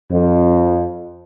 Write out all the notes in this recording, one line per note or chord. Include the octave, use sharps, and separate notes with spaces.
F2